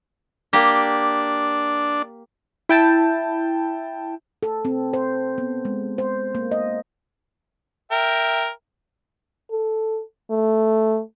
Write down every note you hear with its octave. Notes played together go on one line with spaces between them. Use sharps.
A#3 D4 G4
E4 G5 A5
A4
C4
C5
B3
G#3
C5
A#3
D#5
A#4 E5 G5
A4
A3